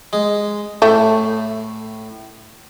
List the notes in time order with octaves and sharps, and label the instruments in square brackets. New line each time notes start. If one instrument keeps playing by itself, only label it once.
[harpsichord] G#3
[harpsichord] A2 [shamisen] A3